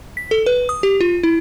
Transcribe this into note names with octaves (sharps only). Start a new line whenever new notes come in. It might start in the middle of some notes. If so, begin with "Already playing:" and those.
B6
A4
B4
D#6
G4
F4
E4